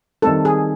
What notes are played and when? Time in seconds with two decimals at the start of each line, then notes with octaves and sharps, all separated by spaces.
0.22 D#3 G3 C4 A4
0.45 G#4